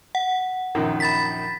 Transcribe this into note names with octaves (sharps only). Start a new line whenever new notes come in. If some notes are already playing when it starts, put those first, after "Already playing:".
F#5
A#1 F#2 D#3
B5 A6 B6